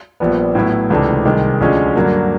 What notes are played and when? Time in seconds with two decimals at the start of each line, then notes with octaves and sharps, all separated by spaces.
0.20 A#1 A#2 G3 B3
0.55 A2 F#3 B3 E4
0.90 C#2 C3 E3 A3 D4
1.25 C2 C3 D#3 G#3
1.60 D2 D3 F3 G#3 C#4
1.96 G2 D3 F#3 A#3